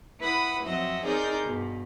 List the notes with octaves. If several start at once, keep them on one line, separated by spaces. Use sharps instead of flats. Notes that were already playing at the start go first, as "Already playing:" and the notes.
E4 B4 F#5 B5 D#6
F2 F#3 C4 D#5 E5 F#5
C4 D#4 G#4 A#4 D5 G6
G2 B2